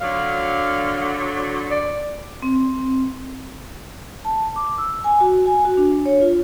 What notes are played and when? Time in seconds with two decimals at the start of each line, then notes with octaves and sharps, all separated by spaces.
0.01 D3 F#3 F5
1.71 D5
2.42 C4
4.25 A5
4.56 D6
4.78 E6
5.04 G#5
5.21 F#4
5.46 G#5
5.65 F#4
5.77 D4
6.06 C#5
6.22 F4